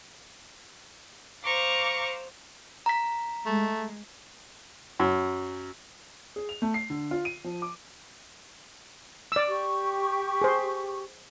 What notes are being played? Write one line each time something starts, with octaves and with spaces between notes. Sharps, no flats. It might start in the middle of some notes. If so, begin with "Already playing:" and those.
C5 F5 A#5 C#6 D6
A#5 B6
G#3 A3
F#2
G#4
F7
A3
C7
D3
F4
D#7
F3
D6
D5 E6
G4 C#6
G#4 C5